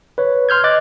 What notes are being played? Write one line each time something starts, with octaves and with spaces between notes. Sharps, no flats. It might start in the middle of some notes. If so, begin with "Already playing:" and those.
B4 C#5
C6 F6 G6 G#6
D#5 D6 F#6 A6